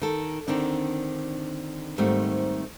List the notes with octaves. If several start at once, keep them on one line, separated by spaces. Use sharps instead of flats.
D#3 A4
D3 D#3 C4 D4
G#2 D#3 G3 A3 C4